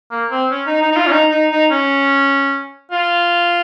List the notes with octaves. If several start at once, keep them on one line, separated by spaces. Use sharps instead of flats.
A#3
C4
C#4
D#4
D#4
D#4
F4
C#4
D#4
D#4
D#4
C#4
F4